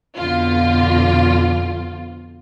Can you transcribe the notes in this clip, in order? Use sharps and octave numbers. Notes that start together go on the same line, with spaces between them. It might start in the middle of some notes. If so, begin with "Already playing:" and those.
F2 B2 D3 F4